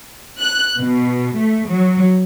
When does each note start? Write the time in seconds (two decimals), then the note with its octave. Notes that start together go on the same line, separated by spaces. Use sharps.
0.40 F#6
0.79 B2
1.37 A3
1.68 F#3